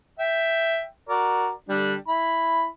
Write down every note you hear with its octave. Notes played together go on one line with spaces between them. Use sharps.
E5 G5
F#4 A#4 D5
D3 G3 D4
E4 B5